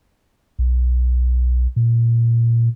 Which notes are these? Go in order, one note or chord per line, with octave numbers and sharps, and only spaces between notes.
B1
A#2